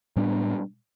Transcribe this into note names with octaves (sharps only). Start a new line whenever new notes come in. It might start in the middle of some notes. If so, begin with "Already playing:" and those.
A2 G3 B3 D4